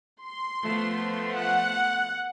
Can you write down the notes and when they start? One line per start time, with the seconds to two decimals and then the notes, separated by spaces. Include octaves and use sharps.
0.22 C6
0.63 F3 A3 B3
1.37 F#5